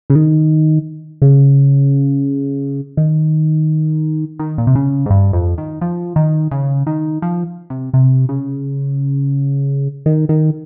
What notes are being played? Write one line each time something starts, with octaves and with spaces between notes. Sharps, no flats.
C#3
D#3
C#3
D#3
D#3
A#2
C3
C#3
G#2
G2
F2
D#3
F3
D#3
C#3
D#3
F3
C3
C3
C#3
D#3
D#3